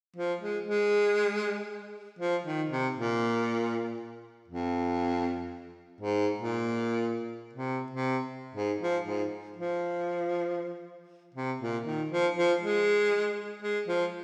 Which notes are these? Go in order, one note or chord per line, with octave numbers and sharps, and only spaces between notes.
F3
G#3
G#3
F3
D#3
C3
A#2
F2
G#2
A#2
C3
C3
G#2
F3
G#2
F3
C3
A#2
D#3
F3
F3
G#3
G#3
F3